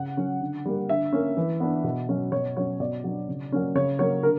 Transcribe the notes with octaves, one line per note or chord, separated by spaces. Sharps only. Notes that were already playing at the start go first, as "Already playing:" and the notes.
Already playing: C#3 F#5
F#3 C#4
D3
G3 A#3
D3 E5
A#3 C#4
E3
B3 D4
B2
F#3 C#4
B2 C#5
F#3 C#4 C#5
B2 D5
F#3 B3 D4
C#3
F#3 A#3 C#4
C#3 C#5
F#3 A#3 C#5
D3 A#4